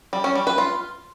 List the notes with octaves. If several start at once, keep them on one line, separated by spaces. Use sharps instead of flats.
G3
C#4
G3
B4
F4